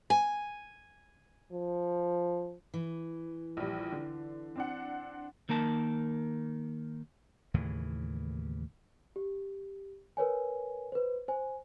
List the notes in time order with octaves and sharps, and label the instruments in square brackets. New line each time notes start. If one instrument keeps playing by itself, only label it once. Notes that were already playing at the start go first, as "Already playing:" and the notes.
[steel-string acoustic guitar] G#5
[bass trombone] F3
[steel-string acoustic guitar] E3
[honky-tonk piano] A#1 G3
D3
C4 D4 F#5
[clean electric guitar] D#3 A#3 A#4 A5
[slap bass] D#2 A2 C#3 E3
[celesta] G4
A#4 B4 C#5 G#5
B4 C5
C5 G#5